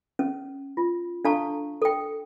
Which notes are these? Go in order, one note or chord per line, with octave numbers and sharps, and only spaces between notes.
C#4
F4
D4 A4 F5 A5 A#5 C#6
A4 G5